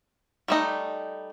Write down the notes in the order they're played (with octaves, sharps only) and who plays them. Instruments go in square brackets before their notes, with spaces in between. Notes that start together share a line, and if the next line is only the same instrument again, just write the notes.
[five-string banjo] G3 A3 D#4